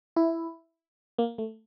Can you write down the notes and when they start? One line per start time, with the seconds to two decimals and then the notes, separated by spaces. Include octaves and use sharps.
0.16 E4
1.18 A#3
1.38 A3